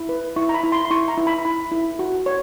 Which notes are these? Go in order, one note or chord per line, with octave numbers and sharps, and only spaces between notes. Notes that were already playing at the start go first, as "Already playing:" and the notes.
Already playing: E4
B4
E4 C#6
A#5
B5
E4
C6
C6
E4 C#6
A#5
E4
B5
E4 B5
E4
F#4
C#5